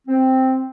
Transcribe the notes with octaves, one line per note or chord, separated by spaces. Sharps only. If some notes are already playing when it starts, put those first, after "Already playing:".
C4